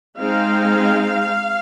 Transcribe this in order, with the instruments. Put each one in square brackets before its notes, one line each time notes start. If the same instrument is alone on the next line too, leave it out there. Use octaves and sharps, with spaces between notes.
[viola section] G#3 C4 D#4 F5